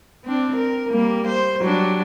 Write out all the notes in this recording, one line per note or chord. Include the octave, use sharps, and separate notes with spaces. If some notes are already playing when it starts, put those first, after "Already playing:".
C4 D4
A#4
G3 A#3
C5
F#3 G3 D4